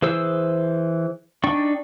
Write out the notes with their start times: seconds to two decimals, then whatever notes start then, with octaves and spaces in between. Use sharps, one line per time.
0.02 E3 G#4 C5 E6
1.44 D4 D#4 D5 G5 C#6